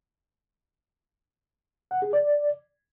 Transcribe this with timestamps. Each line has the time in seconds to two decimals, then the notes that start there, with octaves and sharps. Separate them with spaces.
1.91 F#5
2.02 G#4
2.13 D5